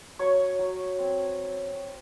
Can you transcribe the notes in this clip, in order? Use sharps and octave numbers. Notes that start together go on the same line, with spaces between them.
F#3 C#5 C#6
F#3
C4